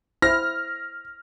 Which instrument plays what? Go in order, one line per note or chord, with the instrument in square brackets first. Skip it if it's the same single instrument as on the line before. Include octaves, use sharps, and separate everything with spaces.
[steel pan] E4 C5 [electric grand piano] F6 [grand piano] A#6